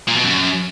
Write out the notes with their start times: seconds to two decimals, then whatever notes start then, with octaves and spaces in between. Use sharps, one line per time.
0.08 A#2
0.16 B2
0.24 F#2